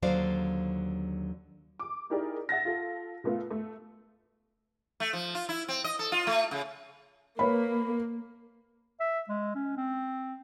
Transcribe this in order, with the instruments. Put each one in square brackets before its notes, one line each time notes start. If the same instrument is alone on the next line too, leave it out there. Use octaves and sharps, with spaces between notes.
[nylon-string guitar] D#2 D3 F#3 C5 D5 F5
[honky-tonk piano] D6
D#4 E4 G4 G#4 A#4 D5
E5 F#5 A6 A#6
F4 A4
A#2 A3 B3 F4
A3
[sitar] A3
F3
F4
E4
C4
D#5
A4
F4
A3
C#3
[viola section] A#3 [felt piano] B4 C#5 B5
[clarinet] E5
G#3
C#4
C4